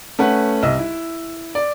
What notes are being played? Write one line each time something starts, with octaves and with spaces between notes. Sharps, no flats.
A3 C#4 B4 F#5 F#6
C2 D#5 E6
E4
D5